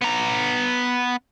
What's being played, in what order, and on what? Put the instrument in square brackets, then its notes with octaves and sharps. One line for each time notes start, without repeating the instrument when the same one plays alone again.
[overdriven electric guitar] B3 A#5